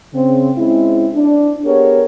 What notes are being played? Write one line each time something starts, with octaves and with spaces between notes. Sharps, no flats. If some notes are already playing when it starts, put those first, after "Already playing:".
C#3 C4
G#3 C4 C#4 E4
D4
B3 G4 G#4 A#4 C#5